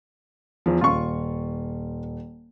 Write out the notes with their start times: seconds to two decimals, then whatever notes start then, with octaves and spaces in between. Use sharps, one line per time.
0.66 E2 F3
0.81 D#1 F4 C#6